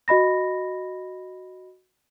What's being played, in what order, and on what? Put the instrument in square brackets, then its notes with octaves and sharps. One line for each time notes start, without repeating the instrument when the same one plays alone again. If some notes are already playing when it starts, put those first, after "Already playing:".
[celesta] F#4 D#5 B5 A#6